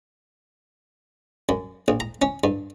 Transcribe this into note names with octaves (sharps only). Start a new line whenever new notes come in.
F#2
A#1
A#5
C#4
G2